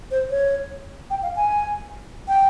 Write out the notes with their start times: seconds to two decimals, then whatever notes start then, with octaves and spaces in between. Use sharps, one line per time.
0.11 C5
0.31 C#5
1.10 G5
1.23 F5
1.36 G#5
2.28 G5